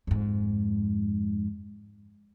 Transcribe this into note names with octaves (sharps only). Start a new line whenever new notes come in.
F2 G#2